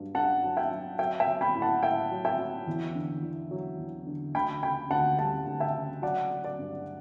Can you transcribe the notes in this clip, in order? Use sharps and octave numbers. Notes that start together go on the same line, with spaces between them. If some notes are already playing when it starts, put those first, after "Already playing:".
Already playing: G2 F#3
G2 F#5 A5
F#3
E5 G5
F#3
F#3 E5 G5
E5 G5
F#3
G5 B5
A2
F#5 A5
A2 E5 G5
F#3
E5 G5
F#3
E2
D3
E2
F#3
E2
D3
D2 G5 B5
C#3 G5 B5
D2 F#5 A5
G3 F#5 A5
D2
E5 G5
C#3
F#3 D5 F#5
F#3
D5
G2